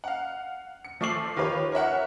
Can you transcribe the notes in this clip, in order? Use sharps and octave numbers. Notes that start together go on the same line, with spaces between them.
F5 F#5
C#7
F3 A3 C#6 D6 C7 F#7
D#3 F4 G4 B4 C#5
A#4 C#5 E5 F#5